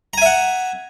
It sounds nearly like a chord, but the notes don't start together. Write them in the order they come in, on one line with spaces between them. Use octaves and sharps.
A#5 G#5 E5 F#5